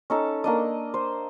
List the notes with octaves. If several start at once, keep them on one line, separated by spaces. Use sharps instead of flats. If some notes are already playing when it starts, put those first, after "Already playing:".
C#4 D#4 A4
A#3 D4 D#5
C5